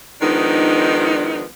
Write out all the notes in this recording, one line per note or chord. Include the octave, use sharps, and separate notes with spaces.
D#3 F3 G#3 B3 D4 D#4